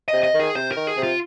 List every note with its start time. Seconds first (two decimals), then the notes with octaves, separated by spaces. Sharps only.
0.08 C3 D#5
0.24 D#5
0.34 D#3
0.40 G#4
0.55 C3 C5
0.72 D#3 A#4
0.87 G#4
0.97 C3
1.03 F4